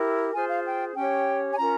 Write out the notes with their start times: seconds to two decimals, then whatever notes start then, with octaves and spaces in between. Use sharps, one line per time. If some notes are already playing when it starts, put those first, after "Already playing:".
Already playing: E4 G4 A#4
0.34 F4 G#4 C5 G#5
0.49 F5
0.64 G5
0.95 C#4 G4 C#5 G5
1.52 G#5
1.56 C#4 F4 A#4 A#5